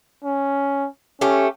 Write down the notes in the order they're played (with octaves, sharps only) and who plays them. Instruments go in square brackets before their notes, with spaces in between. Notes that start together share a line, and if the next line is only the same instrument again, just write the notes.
[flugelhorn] C#4
[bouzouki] A3 G4 [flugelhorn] C#4